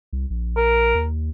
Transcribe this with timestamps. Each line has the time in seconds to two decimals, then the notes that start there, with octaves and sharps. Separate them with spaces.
0.13 C2
0.30 A#1
0.56 A#4
0.95 D#2